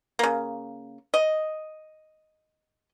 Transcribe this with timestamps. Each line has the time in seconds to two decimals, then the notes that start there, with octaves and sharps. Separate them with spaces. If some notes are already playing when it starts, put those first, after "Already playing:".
0.19 C#3 A#3
1.14 D#5